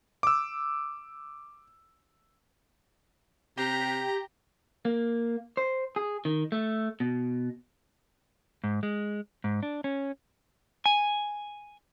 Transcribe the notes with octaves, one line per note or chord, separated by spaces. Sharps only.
D6 E6
C3 G4 A#5
A#3
C5
G#4
D#3
A3
B2
G#2
G#3
G#2
D4
C#4
G#5